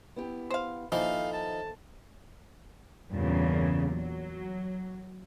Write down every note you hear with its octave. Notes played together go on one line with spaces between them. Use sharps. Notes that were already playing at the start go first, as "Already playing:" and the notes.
B3 E4 G4
C5 F5
D#2 E3 F3 D#4 A4 C5 F5
A5
E2 G2 A#2 C#3
F#3